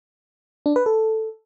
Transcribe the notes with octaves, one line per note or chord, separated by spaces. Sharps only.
D4
B4
A4